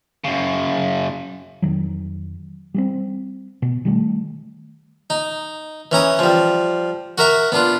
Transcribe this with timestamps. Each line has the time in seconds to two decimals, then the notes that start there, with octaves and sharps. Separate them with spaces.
0.24 F#2 C#3
1.62 F2 D#3 F#3
2.74 G3 G#3 C4
3.62 B2
3.85 D#3 G3 A3
5.10 D#4
5.92 E3 C#4 A#5 D#6
6.19 F3 G3
7.18 F#4 A#4 E5 A#5
7.52 B3 D4 F4